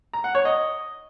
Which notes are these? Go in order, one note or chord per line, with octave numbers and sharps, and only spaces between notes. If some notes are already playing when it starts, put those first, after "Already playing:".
A#5
F#5
C#5
D#5